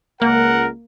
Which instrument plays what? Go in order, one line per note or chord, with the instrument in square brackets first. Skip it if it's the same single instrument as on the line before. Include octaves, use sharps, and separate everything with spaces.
[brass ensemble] C#2 F#5 [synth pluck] A#3 [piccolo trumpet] A#4